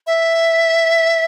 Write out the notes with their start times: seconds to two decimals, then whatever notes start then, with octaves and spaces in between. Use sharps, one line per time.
0.07 E5